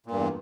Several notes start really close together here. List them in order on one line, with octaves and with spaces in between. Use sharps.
A#2 G2 E2